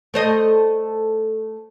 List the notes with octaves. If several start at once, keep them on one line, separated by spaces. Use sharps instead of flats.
A3 C5 D#5